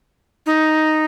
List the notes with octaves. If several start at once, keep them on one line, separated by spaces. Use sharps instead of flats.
D#4